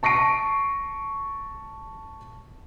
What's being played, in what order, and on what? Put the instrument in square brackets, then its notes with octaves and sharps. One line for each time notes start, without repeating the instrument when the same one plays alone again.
[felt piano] A5 C#6 A#6 C7 D7